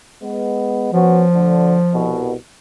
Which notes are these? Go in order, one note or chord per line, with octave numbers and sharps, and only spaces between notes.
G#3 B3
F3 B3 C#4 F#4
D2 D3
C2 B2